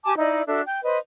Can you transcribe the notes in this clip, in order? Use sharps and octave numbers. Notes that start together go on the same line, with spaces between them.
G4 G#5 A5 D6
D#4 E4 D5 D#5
D4 F#4 A4 E5
G5 G6
B4 C5 D#5